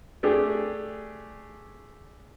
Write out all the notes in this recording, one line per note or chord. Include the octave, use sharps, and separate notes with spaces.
A3 D4 G4 G#4